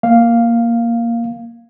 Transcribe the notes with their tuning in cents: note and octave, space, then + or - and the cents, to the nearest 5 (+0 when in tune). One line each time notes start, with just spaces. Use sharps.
A#3 +0 F5 +0